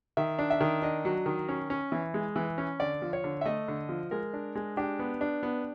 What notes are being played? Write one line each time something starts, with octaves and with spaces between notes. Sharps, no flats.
D#3 E5
D4
E5
D#3
D4 D#5
F#3
D#3
C#4
C#4
E3
G#3
E3
C#4
D3 D5
F3
C#5
D3
E5
A3 D#5
D3
F3
G#3 A#4
D4
G#3
D4 G4
B3
D4
B3